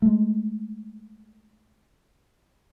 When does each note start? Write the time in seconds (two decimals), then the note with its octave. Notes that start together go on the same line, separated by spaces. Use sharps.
0.02 G#3 A3